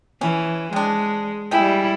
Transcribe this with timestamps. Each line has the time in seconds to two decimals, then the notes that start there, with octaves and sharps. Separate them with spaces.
0.21 E3 C#4
0.73 C3 G#3 D4
1.51 G3 G#3 E4 G5